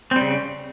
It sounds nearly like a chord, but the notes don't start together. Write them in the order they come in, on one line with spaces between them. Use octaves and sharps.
C4 G3 C#3